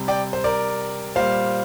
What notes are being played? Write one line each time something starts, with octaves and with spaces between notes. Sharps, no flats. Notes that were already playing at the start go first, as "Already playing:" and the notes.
Already playing: C3 G3
D5 G5
C5
A#4 D5
A#2 G3 C5 F5